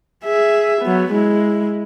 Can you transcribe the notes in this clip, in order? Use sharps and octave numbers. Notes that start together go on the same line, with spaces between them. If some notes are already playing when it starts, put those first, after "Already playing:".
G#4 E5
F#3 B3
G#3 E4